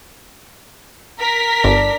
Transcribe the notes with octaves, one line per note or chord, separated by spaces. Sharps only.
A#4 B6
G1 D4